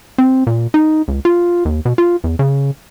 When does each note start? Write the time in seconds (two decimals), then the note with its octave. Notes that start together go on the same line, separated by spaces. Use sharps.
0.18 C4
0.47 A#2
0.74 D#4
1.08 C#2
1.25 F4
1.65 D#2
1.85 B2
1.98 F4
2.24 E2
2.39 C#3